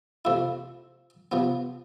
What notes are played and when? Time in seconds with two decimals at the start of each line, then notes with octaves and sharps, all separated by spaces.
0.25 C3 F3 A3 E4
1.32 C3 F3 B3